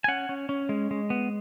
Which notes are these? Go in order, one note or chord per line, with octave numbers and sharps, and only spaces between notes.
G#5
C#4 F#5
C#4
C#4
G#3
G#3
B3